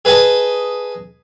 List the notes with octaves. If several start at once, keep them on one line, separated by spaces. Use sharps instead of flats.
G#4 B4 D#5 G#5 A5